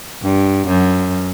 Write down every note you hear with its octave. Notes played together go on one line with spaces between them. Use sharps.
G2
F#2